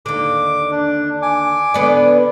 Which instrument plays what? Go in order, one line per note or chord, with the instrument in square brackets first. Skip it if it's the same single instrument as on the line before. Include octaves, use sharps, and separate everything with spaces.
[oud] D#2 D3 [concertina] D6
[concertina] D4
G#5 D6
[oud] D3 B3 D5